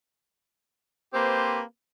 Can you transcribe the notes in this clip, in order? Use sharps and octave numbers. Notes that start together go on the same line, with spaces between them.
A#3 C4 G4 B4 C5